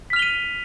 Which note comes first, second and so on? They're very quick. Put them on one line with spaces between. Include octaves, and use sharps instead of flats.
B6 F6 F7 G7 D#7